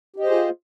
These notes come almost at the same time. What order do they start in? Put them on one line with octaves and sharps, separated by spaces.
G4 D#5 C5 G#4 F4